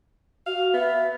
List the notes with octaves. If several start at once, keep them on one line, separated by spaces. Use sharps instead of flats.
F#4 F5
B3 E5